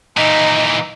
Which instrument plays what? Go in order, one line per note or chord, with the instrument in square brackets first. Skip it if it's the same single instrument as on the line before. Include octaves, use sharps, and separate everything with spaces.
[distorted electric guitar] A#2 E3 [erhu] D#4